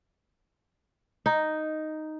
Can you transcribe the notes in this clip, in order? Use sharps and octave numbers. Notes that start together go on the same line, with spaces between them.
D#4